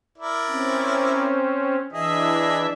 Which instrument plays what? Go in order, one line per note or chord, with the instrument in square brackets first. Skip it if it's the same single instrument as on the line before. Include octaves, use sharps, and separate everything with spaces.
[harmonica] E4 A#4 D5
[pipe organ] C4 C#4
[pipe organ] E3 D4 E5 [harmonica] G#4 D#5